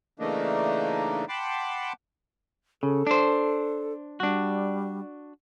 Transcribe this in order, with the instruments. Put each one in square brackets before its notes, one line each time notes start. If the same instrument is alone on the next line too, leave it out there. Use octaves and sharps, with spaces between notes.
[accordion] C#3 E3 A3 A#3 D4 D#4
F#5 G5 A5 B5 C6 D6
[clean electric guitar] C#3 [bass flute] A4
[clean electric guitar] D4 C5
[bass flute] G3 [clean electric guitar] D4 F#4